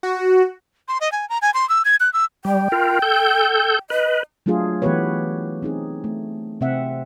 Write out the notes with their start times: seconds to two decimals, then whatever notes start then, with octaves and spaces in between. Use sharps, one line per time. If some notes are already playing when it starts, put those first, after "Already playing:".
0.03 F#4
0.88 C6
1.01 D#5
1.12 G#5
1.29 A#5
1.42 G#5
1.54 C6
1.69 E6
1.85 G#6
2.00 F#6
2.13 E6
2.45 G3 G5
2.72 F4 A#4
3.02 A4 G6
3.90 B4 D#5
4.46 F#3 A3 D4 F4 G#4
4.82 E3 A3 B3 G4 B4 C#5
5.63 C4 D#4 G#4
6.04 A3
6.61 C3 C4 E5 F#5